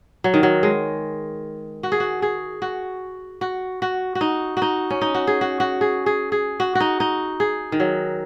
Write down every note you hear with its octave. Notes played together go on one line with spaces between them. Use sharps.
F#3
D#3
F#3
G#3
F#4
G#4
F#4
G#4
F#4
F#4
F#4
F#4
D#4
F#4
D#4
C#4
D#4
F#4
G#4
F#4
F#4
G#4
G#4
G#4
F#4
F#4
D#4
D#4
G#4
D#3
F#3